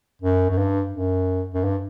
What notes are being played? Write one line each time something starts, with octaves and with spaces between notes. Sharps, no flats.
F#2
F#2
G2
F#2
F#2
G2